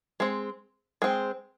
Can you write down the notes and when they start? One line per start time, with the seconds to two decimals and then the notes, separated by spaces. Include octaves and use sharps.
0.20 G#3 C4
1.02 G#3 C4